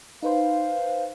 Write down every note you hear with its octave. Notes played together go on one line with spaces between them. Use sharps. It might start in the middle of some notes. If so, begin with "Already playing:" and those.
D#4 B4 C5 F5